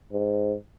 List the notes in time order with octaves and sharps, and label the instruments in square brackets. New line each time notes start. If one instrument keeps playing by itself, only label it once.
[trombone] G#2